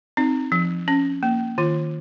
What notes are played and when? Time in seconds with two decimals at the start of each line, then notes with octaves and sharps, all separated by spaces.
0.17 C4 D#4
0.52 F3
0.88 C#4
1.23 A#3
1.58 D#3 F4